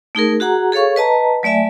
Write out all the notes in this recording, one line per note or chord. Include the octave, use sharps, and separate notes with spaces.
A3 D#4 G#4 A#4
F#4 G#4 F#5 A#5
G#4 A4 C#5 F5 C#6
B4 D#5 A5 A#5
F#3 A3 D5 E5 G#5